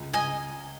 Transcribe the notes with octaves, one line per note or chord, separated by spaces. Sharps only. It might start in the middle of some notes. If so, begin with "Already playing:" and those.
Already playing: C#2
C#2 D#5 G#5